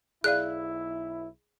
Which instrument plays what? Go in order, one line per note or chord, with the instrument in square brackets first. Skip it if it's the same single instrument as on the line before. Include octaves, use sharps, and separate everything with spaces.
[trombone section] B1 E4 [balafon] G#4 D5 F5 [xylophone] F#6